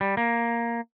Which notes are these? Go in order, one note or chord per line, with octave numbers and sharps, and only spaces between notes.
G3
A#3